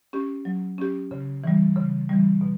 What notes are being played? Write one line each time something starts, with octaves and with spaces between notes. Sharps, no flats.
C#4 G4
F#3
C#4 G4
C#3
E3 G3
C#3
E3 G3
B2